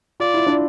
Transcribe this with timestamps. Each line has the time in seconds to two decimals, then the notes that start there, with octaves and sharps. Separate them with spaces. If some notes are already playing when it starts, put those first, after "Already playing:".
0.20 F4 D5
0.34 E4
0.47 D4